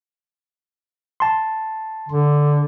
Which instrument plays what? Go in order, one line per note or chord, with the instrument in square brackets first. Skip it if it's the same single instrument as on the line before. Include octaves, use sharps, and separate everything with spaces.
[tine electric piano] A5 C6
[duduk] D3